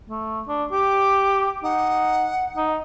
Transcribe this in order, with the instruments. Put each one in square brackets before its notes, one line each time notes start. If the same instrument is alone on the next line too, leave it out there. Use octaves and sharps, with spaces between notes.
[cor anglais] A3
D4
[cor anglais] G4 [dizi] D6
[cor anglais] D#4 [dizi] F#5
[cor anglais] D#4